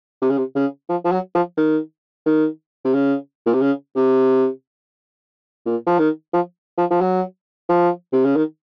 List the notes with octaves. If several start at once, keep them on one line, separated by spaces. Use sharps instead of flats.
C3
C#3
C3
C#3
F3
F3
F#3
F3
D#3
D#3
C3
C#3
A#2
C3
C#3
C3
A#2
F3
D#3
F3
F3
F3
F#3
F3
C3
C#3
D#3